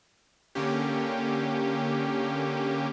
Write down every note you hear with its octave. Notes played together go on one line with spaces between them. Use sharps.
D3 A#3 C#4 G4